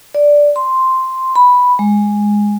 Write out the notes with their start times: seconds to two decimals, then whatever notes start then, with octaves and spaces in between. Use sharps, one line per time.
0.15 D5
0.56 C6
1.36 B5
1.79 G#3